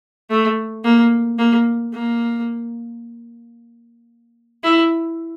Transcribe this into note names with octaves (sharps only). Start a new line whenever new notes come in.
A3
A#3
A#3
A#3
E4